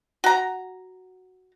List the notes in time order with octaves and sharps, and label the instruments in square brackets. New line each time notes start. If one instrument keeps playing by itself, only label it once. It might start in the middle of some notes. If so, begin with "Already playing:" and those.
[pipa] F#4 A#5